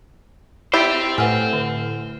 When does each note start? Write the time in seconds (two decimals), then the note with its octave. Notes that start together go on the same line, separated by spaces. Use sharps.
0.73 E4 G4 C5 G5 G6 A6
1.18 A2 B4 F#5 G#5 F6
1.53 D3